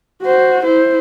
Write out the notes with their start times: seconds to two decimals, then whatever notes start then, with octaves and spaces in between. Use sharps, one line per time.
0.23 F#4 C5
0.64 E4 C5